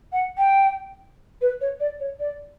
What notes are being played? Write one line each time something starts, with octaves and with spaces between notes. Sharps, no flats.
F#5
G5
B4
C#5
D5
C#5
D5